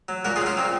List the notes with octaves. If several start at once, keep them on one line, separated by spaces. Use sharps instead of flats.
F#3
A#2 F#4 A#4
F4 G#4
F#3
C#4 F4
A#2 C4